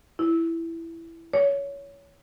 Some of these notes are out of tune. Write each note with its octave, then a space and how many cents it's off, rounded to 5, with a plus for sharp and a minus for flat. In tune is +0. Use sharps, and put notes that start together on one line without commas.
E4 +10
C#5 +20